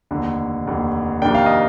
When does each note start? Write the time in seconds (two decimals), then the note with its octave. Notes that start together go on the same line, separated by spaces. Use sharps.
0.11 F1 D#2 D3
0.66 F1 D#2 D3
1.22 F2 C3 D#3 A#3 D4 G5
1.35 F5
1.46 D#5